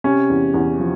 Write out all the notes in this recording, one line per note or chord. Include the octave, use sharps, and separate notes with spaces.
C3 C#4
E2
E2
F3